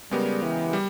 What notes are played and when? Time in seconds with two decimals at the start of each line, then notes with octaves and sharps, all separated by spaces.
0.11 C#3 G3 G#3 B3 G4 A#4
0.42 E3
0.73 G3